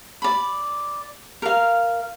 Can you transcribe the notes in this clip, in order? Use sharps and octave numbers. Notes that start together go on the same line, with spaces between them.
D5 B5
A#4 F5